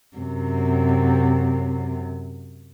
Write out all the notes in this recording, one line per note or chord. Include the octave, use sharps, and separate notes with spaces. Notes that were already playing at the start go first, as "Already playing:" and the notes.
F#2 C3